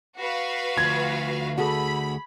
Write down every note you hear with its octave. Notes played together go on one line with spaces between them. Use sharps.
F#4 B4 F5
D2 F3 G#6
F#4 G#4 A4 B5